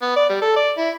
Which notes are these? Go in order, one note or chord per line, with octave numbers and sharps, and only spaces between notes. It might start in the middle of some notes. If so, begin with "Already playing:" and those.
B3
D5
G3
A4
D5
E4